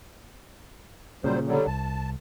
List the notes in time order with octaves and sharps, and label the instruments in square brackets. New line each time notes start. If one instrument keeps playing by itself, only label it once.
[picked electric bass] A#2 C#3 [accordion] F#3 G3 C5
[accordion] D3 F#3 G3
[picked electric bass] C2 [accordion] A5